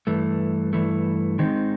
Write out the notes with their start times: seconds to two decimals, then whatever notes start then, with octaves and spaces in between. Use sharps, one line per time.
0.07 G2 E3 A3
0.73 G2 E3 A3
1.39 G#2 D#3 G#3 C4 D#4